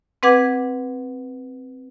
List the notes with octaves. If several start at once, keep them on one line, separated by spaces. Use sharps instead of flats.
C4 B4 F#5 D6 G#6